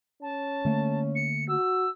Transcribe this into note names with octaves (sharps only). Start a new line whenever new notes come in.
C#4 A5
D3 A3 A#3
C#7
F#4 E6